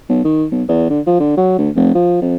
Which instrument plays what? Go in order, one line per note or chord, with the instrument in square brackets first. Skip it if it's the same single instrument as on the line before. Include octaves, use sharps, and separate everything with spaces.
[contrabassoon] B1
D#3
B1
E2
D3
F3
D3
F#3
D2
F1
F3
F2